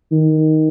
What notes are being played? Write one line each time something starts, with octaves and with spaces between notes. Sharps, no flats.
D#3